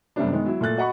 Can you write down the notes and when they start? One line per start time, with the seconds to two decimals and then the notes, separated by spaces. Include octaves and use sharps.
0.16 F#2 C3 G3 A3 B3 D4
0.32 D#3 G#3 B3
0.46 F#3 E4
0.61 A#2 A3 A4 F#6 A6
0.77 F#4 D#5 F#5 B5 C#6